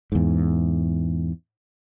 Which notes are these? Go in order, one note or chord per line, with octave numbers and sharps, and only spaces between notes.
E2 G#2